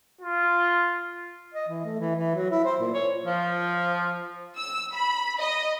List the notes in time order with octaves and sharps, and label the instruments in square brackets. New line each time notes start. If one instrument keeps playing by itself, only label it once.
[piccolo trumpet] F4
[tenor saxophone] D#5
E3
A3
E3
E3
F#3
E4
C5
A#2
C#5
[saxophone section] F3
[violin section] E6
B5
D#5